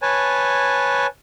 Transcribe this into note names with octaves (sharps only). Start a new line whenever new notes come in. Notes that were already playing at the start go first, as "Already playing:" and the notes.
B4 C#5 G#5 A5